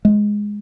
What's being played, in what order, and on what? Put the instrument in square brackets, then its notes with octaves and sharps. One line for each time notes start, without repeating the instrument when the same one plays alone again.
[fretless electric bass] G#3